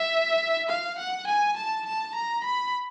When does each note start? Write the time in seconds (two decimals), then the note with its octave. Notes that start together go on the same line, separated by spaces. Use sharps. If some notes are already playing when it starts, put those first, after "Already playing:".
Already playing: E5
0.70 F5
0.98 F#5
1.28 G#5
1.57 A5
1.87 A5
2.15 A#5
2.45 B5